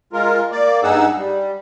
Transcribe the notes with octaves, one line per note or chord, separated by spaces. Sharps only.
G#3 F4 A#4
A#3 D5
G2 D#4 G#4 F#5 E6
G3